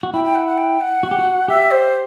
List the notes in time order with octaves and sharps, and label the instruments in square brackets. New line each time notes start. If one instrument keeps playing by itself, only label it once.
[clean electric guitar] F#4
[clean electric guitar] E4 [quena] G5
[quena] G5
F#5
F#5
G5
F#5
[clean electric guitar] F#4
G4
F#4
[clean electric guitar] G4 [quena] E5
[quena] C5